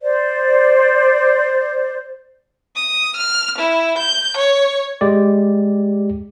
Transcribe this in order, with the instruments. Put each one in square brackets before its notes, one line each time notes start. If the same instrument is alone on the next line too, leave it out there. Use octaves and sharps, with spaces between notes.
[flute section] C5 D5
[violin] D#6
F6
E4
G6
C#5
[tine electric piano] G#3 G4 D5